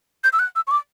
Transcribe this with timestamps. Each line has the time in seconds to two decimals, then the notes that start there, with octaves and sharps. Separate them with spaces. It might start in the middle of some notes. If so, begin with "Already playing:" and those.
0.24 G6
0.33 E6
0.39 F#6
0.56 E6
0.67 C#6
0.71 D6